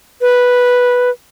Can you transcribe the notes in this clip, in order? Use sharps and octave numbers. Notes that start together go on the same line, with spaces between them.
B4